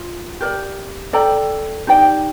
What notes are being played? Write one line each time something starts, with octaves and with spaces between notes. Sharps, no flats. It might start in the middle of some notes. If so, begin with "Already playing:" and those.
Already playing: F4
G4 A#4 D5
A4 D5 G5 A#5
D#4 G4 D5 G5